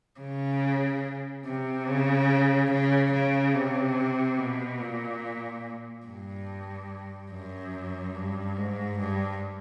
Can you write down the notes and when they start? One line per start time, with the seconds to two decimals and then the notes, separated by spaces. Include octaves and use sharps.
0.20 C#3
1.46 C3
1.87 C#3
2.71 C#3
3.12 C#3
3.54 C3
4.39 B2
4.81 A#2
6.06 G2
7.31 F#2
8.15 G2
8.57 G#2
8.99 G2